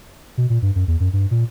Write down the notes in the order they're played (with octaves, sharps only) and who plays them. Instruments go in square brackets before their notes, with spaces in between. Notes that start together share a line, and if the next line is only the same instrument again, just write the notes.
[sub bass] B2
A#2
G2
F#2
E2
F#2
G2
A#2